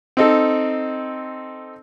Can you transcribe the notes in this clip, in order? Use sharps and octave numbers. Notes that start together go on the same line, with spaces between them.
C4 D#4 A4